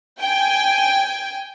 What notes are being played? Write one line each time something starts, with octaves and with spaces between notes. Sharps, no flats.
G5 G#5